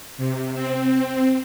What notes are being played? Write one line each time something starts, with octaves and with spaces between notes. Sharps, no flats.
C3
C4